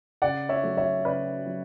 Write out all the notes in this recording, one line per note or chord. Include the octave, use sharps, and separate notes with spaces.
C#3 D5 F#5
C#5 E5
F#3 A3
C#5 E5
C#3 B4 D5
F#3